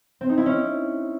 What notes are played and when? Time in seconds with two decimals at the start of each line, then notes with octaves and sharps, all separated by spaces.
0.21 C4
0.29 D#4
0.38 E4
0.46 C#4